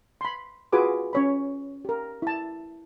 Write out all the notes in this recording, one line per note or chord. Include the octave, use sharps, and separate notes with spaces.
B5 C6
F4 F#4 G#4 B4 G#5 D6
C#4 C#5 B5
G4 A#4
E4 A5